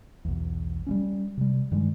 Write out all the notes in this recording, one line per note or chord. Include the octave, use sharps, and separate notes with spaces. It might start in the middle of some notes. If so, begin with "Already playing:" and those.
B1 E2
G3 A3 C#4
C3 G3
G2 D#3 G3 G#3